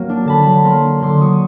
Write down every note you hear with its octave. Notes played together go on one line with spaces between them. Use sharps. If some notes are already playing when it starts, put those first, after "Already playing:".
Already playing: F#3 A#3
D4
D3 A5 B5
F#3
A#3 A#5 C6
D4
D3 C6 D6
F#3 C#6 D#6